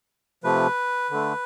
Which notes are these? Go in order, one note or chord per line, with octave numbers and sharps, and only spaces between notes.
C3 F3 A3 B4
D3 A3